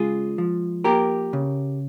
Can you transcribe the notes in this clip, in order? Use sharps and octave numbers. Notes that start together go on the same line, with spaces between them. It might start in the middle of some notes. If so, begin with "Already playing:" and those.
Already playing: C#3 G#3 F4 G#4
F3
A#3 G4 A#4
C#3